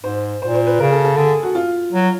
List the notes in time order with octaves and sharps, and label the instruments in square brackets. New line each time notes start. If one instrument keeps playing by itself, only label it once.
[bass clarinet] G#2 [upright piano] C5
[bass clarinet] A#2 [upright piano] C5
[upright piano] C5
B4
[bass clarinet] C#3 [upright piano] A#4
[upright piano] A4
A4
[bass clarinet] D3 [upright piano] G#4
[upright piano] F#4
F4
[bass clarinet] F#3